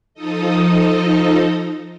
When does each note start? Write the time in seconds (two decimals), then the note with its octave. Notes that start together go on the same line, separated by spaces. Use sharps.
0.14 F3 D#4 A4 D#5